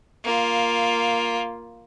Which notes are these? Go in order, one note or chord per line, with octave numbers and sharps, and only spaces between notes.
A#3 F4